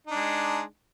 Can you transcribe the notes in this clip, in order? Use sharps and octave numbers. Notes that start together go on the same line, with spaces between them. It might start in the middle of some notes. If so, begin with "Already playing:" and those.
G#3 D4 D#4